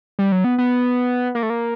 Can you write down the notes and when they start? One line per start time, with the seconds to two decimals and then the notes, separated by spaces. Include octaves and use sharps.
0.19 G3
0.32 F#3
0.44 B3
0.58 B3
1.35 A#3
1.43 A3
1.50 A#3